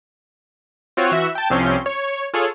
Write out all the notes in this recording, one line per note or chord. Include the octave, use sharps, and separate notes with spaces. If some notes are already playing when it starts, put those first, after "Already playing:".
C4 F4 F#4 C#5
E3 F#4 E5
G5 A5
C2 C3 F3 C4 C#4 C6
C#5
F4 G#4 A4 C#5